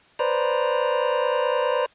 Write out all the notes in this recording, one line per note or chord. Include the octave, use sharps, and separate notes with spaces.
B4 C5 D5 A#5